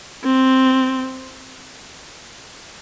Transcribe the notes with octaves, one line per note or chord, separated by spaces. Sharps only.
C4